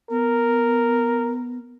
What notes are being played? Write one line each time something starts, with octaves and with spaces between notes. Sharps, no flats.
B3 A#4